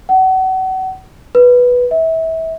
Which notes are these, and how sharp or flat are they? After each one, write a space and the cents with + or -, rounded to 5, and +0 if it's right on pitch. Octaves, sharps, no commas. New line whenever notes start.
F#5 +30
B4 -5
E5 -30